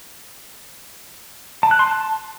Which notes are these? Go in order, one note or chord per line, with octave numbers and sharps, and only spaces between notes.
A5
F#6
C6
A5